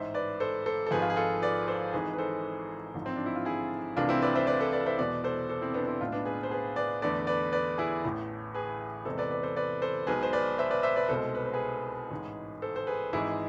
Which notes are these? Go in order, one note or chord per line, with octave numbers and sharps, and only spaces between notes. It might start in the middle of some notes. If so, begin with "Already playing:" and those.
Already playing: A1 G#2 G#3 C5 E5
B4 D5
A4 C5
A4 C5
A4
G#1 G#2 F3 G#4 B4
F4
G#4
F4 A4
B4 D5
A4 C5
G#1 G#2 E3 G#4 B4
B4
A4 C5
A1 G#2 F3
C4
D4
E4
F4
E4 G#4
C2 C3 E3 A3 D4 F4
C4 E4
B4 D5
C5 E5
B4 D5
A4 C5
B4 D5
C5 E5
E2 B2 G#3 B4 D5
A4 C5
A4 C5
C4 E4
B3 D4
C4 E4
B1 A2 G#3 D4 F4
B3 D4
G#4 B4
C5
G#4 B4
B4 D5
E2 D3 A3 B4 D5
B4 D5
B4 D5
E4 G#4
A1 A2 E3
G#4 B4
E2 C3 E3 G#3 A4 C5
B4 D5
B4 D5
A4 C5
B4 D5
A4 C5
B1 B2 G#3 G#4 B4
C5
B4 D5
C5 E5
B4 D5
C5 E5
B4 D5
C2 B2 G#3 A4 C5
B4
C5
G#4 B4
A1 G#2 G#3
A4 C5
C5
G#4 B4
G#1 G#2 E3 G#3 E4 G#4